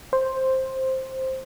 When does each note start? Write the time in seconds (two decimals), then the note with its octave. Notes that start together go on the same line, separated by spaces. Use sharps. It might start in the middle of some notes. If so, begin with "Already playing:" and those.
0.13 C5